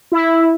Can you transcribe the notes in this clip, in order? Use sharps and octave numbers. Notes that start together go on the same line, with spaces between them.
E4